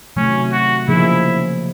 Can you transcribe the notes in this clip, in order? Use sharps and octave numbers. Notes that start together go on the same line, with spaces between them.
C3 D#3 F#3 A3 C#4
F#4
C#3 F3 A#3 D#4 E4 G#4